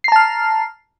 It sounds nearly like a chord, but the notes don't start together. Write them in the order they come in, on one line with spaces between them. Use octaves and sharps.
C7 A#5 A5 F6